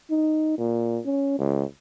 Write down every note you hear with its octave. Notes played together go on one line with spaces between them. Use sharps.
D#4
A#2
C#4
C#2